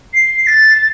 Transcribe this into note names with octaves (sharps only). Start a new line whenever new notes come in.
C7
A6